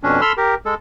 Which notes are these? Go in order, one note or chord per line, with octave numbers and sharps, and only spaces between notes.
F2 B2 C#4 D4
A4 B5 C6 E6 F6
G4 A#4
G#3 A4